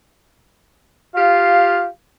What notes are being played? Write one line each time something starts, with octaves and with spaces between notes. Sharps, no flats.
F4 G4 F5